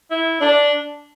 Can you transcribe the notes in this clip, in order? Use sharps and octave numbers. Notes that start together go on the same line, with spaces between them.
E4
D4